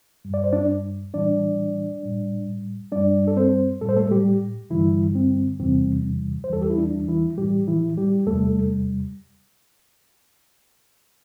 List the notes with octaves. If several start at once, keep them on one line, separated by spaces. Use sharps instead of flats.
G2 G3
D5
C5
D4 D5
A2 E3 G3 D4 D5
A2 G3
G2 G3 D4 D5
A4
C4 C5
A2 G3 A4
C5
A3 A4
G3 G4
G2 D3 E3 G3 E4
C4
E2 C3 E3 G3 C4
C5
E2 E3 G3 A4
G4
E4
D4
E3 E4
A2 E3 G3 G4
E3 E4
G3 G4
E2 C3 G3 A3 A4